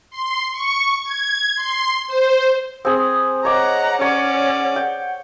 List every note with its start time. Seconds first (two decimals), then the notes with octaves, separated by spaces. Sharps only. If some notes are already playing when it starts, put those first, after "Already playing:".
0.10 C6
0.53 C#6
1.04 G#6
1.55 C6
2.07 C5
2.85 C4 G#4 D#6
3.45 C#5 D#5 F#5 A#5 D6
4.01 C#4 C#5 D5 F#5
4.76 G5